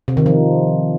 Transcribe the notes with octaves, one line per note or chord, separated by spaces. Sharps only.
C3
D#3
F3